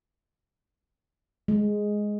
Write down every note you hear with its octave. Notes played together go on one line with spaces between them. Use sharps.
G#3